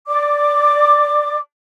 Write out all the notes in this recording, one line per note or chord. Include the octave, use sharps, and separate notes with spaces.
D5 D6